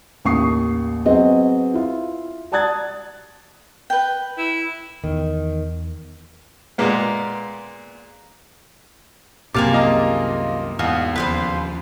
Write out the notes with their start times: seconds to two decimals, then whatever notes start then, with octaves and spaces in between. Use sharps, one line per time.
0.25 A1 D#2 C#6 D#6 C7
1.06 F#3 B3 C4 G#4 D#5
1.74 E4 F4
2.52 D5 A5 D#6 F#6 G#6 A6
3.90 B4 G5
4.38 E4
5.04 E2 D#3
6.78 A#2 G#3 A#3 B3
9.54 C2 F#2 C3 A#3 G#4 F5 A5 D6
9.73 F4 D#5 A#5
10.79 E2 G#2 F4 F#4 D#5
11.16 D#2 C#3 F3 B4 C5 F5